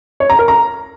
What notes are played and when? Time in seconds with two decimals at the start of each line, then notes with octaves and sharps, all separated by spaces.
0.20 C#5
0.30 A#5
0.39 A#4
0.48 A#5